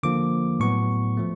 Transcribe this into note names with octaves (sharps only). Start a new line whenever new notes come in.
D3 F3 A#3 D6
A2 F#3 B3 C#6
F3 A3